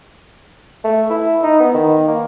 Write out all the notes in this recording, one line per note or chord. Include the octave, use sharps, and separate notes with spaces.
A3
E4
D#4
B3
D#3
A#3